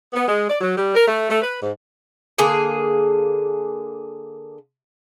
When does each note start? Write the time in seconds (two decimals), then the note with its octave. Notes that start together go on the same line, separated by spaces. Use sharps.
0.13 B3
0.28 G#3
0.49 D5
0.61 F#3
0.76 G3
0.95 A#4
1.07 A3
1.29 A3
1.41 B4
1.62 G#2
2.38 D3 A#3 G#4